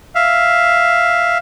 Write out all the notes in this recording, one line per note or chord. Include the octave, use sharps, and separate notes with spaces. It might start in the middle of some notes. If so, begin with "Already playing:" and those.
E5 F5